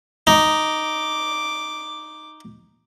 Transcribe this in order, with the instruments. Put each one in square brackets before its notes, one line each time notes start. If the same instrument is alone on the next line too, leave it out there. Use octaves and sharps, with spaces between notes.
[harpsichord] D#4 [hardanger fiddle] D6